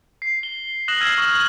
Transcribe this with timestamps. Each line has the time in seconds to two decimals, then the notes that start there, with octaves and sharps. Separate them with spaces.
0.22 C7
0.43 G7
0.88 D#6 F#6 A#6 E7 F#7
1.01 E6 F6 G#6 C7 D#7 F#7
1.18 C#6 D#6 F6 E7